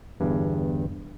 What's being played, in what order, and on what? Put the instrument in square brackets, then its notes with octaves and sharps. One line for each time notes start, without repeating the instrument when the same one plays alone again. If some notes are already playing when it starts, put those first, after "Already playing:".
[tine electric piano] G1 E2 G2